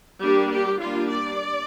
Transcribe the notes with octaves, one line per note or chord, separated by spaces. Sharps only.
G3 A#3 D4 G4
G4
G3 A#3 D4 F4
D5